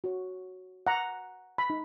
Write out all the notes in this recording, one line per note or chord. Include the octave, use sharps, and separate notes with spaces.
F#4 C#5
F#5 A#5
B5
D#4